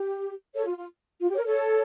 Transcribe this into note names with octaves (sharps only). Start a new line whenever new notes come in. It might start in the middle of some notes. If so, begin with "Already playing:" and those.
Already playing: G4
A4 C#5
F4
F4
F4
G4
C#5
A#4
A4 C#5